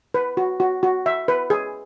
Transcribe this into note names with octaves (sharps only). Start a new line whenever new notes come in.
B4
F#4
F#4
F#4
E5
B4
G#4